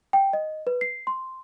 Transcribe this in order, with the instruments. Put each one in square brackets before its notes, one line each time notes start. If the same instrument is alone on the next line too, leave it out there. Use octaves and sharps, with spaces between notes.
[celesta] G5
D#5
B4
C7
C6